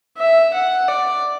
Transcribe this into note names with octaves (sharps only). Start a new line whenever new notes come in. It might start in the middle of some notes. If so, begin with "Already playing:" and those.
E5
F#5
D5